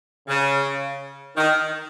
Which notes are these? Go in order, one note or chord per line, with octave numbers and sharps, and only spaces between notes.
C#3
D#3